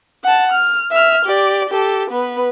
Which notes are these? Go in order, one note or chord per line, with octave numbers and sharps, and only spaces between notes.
F#5 A5
F6
E5 F6
G4 D5
G4 A4
B3 B4